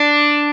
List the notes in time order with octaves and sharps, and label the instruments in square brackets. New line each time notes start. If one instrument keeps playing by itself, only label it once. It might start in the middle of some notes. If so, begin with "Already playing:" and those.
Already playing: [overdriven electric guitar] D4